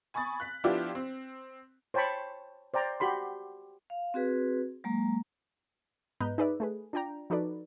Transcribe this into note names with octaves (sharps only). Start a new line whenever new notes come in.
G#5 B5 C#6 D#6 A6
F#6 B6
F3 B3 D4 E4 F4 G4
C4
C5 C#5 G5 A5 B5 C#6
C5 D5 G5 A#5
F#4 G4 B5 C6
F5
C4 F#4 G#4 B4
F#3 G#3 A#3 A#5
G#2 B3 B4 D#5 A#5 G6
D#4 G#4 B4 D5 E5
A3 G#4 B4
D4 F4 D5 G5 A#5
F3 D#4 F#4 A4 B4 D5